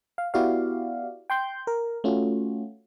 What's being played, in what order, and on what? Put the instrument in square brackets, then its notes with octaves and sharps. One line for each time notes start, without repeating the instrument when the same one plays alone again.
[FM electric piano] F5
B3 E4 F#4 G4 D5 F5
G5 C6 G6
A#4
A3 C#4 F4 F#4